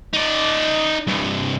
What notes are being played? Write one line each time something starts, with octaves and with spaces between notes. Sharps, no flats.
D#4 D5
C2 G2